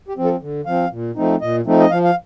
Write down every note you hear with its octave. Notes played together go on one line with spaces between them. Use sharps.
G4
F3 C4
A4
D3
F3 C4 F5
A#2
F3 A3 C4 D#4
A#2 D#5
F3 A3 C4 D#4
D#5
F3 F5
F5